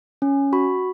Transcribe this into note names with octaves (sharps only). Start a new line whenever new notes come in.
C#4
F#4 B5